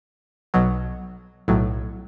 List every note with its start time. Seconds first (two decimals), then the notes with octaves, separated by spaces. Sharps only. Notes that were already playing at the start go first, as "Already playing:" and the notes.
0.54 B1 B2 F#3
1.48 B1 A2 F#3